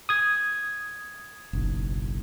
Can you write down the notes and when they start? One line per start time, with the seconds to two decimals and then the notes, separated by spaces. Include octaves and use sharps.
0.09 D#6 G#6
1.53 F#1 B1